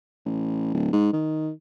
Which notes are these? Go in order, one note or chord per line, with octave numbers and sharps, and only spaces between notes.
A1
D1
G#2
D#3